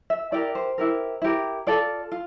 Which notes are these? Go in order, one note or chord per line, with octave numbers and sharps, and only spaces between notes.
E5
E4 G4 A#4 D5
C5
E4 G4 A#4
E4 G4 A#4
F4 A4 D5
F4